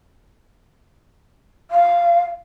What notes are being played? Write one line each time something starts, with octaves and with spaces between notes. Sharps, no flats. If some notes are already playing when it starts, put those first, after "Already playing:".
F5